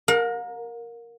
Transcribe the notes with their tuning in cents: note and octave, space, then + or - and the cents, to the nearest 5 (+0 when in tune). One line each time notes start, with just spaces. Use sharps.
A#4 +0 F5 +45